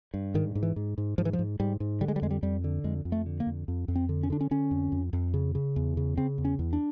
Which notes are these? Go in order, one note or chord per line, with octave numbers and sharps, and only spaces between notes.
G2
G#2 D#3
G#2
E3
G#2
G#2
G#2 F3
E3
F3
G#2
G#2 G3
G#2
D3 G3
G#3
G3
F2 G#3
G3
F2 G3
D3
F2 G#3
F2
A3
D3
A#3
F2
F2
F2
C4
D3
C#4
D3 D4
C#4
D3 C#4
F2
F2
F2
C#3
C#3
E2
C#3
C#3 C4
E2
C#4
E2
D4